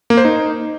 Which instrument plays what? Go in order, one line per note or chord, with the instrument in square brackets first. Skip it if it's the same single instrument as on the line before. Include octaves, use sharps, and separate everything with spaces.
[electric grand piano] A#3
C5
D#4